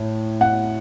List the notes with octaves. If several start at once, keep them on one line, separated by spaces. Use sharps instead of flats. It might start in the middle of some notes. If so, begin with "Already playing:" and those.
Already playing: A2
F#5